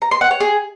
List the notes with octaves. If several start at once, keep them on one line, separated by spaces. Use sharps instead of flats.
A#5
C6
F#5
C#5
G#4